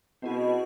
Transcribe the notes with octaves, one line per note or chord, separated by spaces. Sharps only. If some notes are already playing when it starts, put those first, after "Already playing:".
B2 C4 E4 G#4